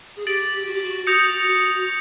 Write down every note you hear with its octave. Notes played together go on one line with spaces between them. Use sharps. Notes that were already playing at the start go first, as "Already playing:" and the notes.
G#4
G4 A6 D7 F#7
F#4
G4
F#4
F#4 D#6 G6 A#6 C#7 F7
F#4